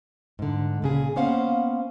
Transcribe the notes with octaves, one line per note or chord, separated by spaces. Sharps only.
G#2 D3
A#2 C#3 G#4
A#3 B3 C#4 C5 F5 F#5